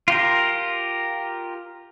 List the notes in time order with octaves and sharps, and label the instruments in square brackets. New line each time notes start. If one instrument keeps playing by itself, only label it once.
[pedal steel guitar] F4 G4 A#4